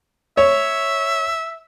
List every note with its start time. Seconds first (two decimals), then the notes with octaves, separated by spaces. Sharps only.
0.37 C#5 E5